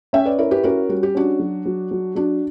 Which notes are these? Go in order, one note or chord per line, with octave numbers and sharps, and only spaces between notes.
C#4 E5 G5
B4 D5
E4 A#4 C#5
G4 B4
C#4 F#4 A#4
G3 F#4
G4
C#4 D4 F#4
F#3
F#3
F#3
F#3 D4 F#4